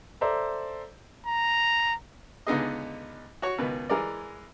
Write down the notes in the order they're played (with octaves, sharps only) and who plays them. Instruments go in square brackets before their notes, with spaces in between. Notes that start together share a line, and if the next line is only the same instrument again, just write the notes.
[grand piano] A4 C5 D5 E5 A#5
[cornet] A#5
[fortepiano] C#2 D3 B3 D#4 G#4 D#5
F#4 C#5
C#2 B2 D#3 B4
E3 G#3 A#4 D5